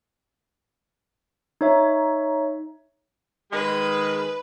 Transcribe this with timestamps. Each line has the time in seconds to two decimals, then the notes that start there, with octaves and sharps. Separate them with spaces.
1.61 D#4 C#5 E5
3.52 D#3 G#3 B4